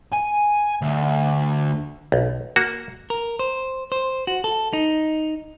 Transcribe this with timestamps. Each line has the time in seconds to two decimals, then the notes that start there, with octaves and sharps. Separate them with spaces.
0.12 G#5
0.82 D2
2.12 B1
2.56 A#3 F#4
3.10 A#4
3.39 C5
3.92 C5
4.27 F#4
4.44 A4
4.73 D#4